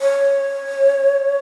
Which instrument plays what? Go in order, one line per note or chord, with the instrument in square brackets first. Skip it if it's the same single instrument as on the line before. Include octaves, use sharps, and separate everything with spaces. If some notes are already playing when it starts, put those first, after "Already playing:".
[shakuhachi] C#5